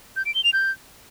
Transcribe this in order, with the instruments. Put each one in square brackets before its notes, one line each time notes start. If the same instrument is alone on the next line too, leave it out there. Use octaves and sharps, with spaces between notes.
[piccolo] G6
D7
G7
F7
G6